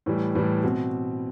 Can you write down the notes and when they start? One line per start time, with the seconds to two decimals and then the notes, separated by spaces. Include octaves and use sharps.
0.06 A2 E3 G3
0.35 A2 E3 G3
0.64 B2 C4